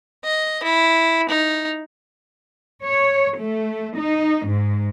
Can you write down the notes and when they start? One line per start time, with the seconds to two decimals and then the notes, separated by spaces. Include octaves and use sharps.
0.24 D#5
0.64 E4
1.29 D#4
2.82 C#5
3.38 A3
3.99 D#4
4.47 G#2